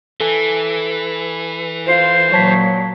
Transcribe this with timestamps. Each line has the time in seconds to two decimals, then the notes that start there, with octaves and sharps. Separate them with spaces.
0.20 E3 A4 G#5
1.86 F4 C5
2.32 A#2 F#3 C#5 A5 B6